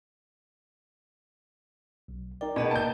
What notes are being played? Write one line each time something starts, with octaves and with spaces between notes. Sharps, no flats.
B1
D#4 A#4 D5 G5
B2 G#4 D#5 F#5
A#3 A5 G6